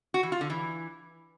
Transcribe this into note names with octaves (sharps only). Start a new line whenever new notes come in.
F#4
E3
F4
D3
E3